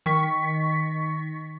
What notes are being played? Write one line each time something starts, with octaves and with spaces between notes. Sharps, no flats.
D#3 C#6 B6